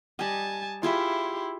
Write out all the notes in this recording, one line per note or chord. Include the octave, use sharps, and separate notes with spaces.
G3 D#5 G#5 A5
E4 F4 G4 G#4 E5 C6